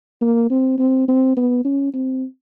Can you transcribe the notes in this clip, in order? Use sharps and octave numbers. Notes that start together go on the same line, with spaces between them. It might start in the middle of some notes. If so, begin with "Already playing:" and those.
A#3
C4
C4
C4
B3
C#4
C4